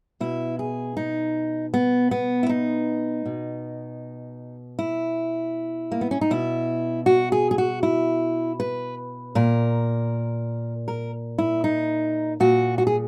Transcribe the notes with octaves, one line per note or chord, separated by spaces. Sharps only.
B2 E4
G#4
D#4
B3
B3
E4
D#4
B2
E4
A#3
B3
C#4
D#4
B2 E4
F#4
G#4
G#4
F#4
E4
B4
A#2 A#4
A#4
E4
D#4
A#2 F#4
F#4
G#4